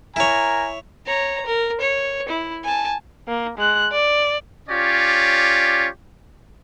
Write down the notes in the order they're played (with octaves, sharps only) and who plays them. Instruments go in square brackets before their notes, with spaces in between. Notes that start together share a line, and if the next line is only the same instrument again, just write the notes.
[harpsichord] E4 C#5 [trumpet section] A#4 G#5 A#5
[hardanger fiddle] C#5 A#5
A#4
C#5
E4
G#5 A5
[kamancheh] A#3
G#3 F#6
D5
[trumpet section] C#4 F4 G4 C#5 D5